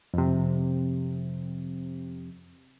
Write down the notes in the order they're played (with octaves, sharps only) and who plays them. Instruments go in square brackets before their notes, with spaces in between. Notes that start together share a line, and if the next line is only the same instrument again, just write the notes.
[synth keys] F2 C3